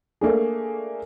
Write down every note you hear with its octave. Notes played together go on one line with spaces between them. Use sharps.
A3 A#3 D4 G#4